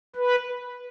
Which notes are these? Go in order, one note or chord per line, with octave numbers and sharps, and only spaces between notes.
B4